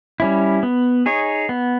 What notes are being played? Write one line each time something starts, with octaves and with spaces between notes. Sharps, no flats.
G3 C#4 E4
B3
D#4 G#4 C#5
B3